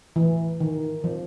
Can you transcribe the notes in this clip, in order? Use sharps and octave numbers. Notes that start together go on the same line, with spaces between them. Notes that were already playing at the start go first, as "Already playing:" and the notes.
E3
D#3
F3